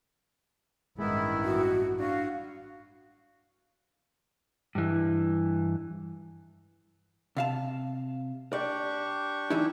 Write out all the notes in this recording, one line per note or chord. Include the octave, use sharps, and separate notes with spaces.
A1 G2 D#3 G#3 B3 E4
F#4
D4 F#4 F5
G2 E3
C3 F5 A5
D4 G4 D5 C#6
E3 D#4 E4